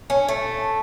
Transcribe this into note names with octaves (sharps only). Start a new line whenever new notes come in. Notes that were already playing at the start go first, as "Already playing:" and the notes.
C#4
A3